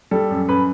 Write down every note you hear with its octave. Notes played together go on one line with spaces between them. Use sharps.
G3 A4
F#2
F#2 B4